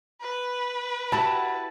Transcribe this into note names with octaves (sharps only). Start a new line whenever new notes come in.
B4
E4 F#4 G4 A5 B5